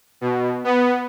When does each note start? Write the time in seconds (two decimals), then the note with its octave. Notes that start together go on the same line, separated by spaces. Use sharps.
0.21 B2
0.64 B3